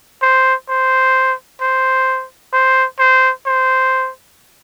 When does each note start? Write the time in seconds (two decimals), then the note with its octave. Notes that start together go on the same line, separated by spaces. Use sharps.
0.22 C5
0.69 C5
1.61 C5
2.53 C5
2.99 C5
3.46 C5